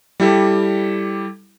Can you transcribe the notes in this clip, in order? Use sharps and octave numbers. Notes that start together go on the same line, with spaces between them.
G3 E4 G4 A4